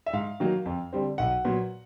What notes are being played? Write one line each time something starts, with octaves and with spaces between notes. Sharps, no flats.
E5
G#2 F5
D#3 F#3 A#3
F2
D3 G3 C4
B1 F#5
A#2 F#3 B3